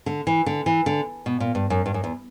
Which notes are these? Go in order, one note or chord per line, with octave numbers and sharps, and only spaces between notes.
D3
E3
D3
E3
D3
B2
A#2
G2
F#2
G2
F#2
E2